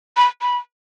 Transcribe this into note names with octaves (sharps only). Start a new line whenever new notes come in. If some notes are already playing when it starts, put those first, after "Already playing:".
B5
B5